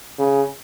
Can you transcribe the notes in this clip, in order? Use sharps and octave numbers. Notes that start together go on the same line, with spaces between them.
C#3